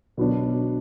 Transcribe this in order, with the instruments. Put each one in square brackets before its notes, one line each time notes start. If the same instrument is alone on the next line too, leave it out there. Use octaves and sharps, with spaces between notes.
[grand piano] B2 F#3 B3 D4